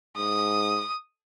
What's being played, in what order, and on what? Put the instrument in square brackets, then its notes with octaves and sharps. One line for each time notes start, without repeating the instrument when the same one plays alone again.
[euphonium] G#2 [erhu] D#6